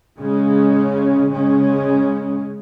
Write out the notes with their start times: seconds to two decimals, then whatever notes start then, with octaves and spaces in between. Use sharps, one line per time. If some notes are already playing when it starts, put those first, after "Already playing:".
0.19 C#3 G#3 C#4
1.29 C#3 G#3 C#4